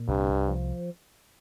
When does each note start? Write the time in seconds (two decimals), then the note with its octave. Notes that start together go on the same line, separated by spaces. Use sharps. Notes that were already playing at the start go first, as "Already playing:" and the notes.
Already playing: A#2
0.08 C2 G2
0.29 C2
0.48 F3